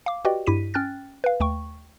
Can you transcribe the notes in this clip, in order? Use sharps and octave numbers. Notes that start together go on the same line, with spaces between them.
F5 D6
F#4 G4 B4 D5 D#5 G5
G2 E4 G4 B6 D#7
C#4 G5 F6 F#6 A6
B4 F5
D#2 A3 G5 C#6